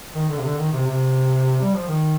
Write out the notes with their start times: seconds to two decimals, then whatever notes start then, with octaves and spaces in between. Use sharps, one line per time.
0.15 D#3
0.30 D3
0.39 C3
0.44 D3
0.58 D#3
0.73 C3
0.87 C3
1.61 G3
1.75 F3
1.88 D#3